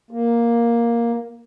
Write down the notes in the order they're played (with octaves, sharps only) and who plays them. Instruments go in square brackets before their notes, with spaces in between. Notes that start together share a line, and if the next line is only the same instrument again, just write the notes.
[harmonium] A#3